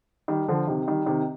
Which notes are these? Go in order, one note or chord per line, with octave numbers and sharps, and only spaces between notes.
D#3 G3
D3 F3
C3 D#3
D#3 G3
C3 D#3